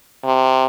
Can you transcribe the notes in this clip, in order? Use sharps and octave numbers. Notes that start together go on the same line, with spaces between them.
C3